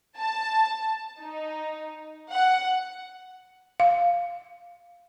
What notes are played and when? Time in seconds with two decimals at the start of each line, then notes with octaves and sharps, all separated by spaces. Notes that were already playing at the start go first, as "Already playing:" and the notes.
0.17 A5
1.20 D#4
2.31 F#5
3.80 F5